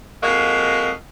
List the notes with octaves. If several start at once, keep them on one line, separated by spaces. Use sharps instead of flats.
F2 G#3 A#3 F#4 D#5 F5